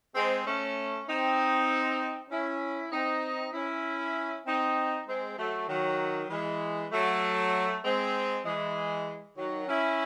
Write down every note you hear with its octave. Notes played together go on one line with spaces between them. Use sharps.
G#3 C4
A3 C#4
C4 D#4
C#4 E4
C4 D#4
C#4 E4
C4 D#4
G#3 C4
F#3 A3
D#3 F#3
E3 G#3
F#3 A3
G#3 C4
E3 G#3
D#3 F#3
C#4 E4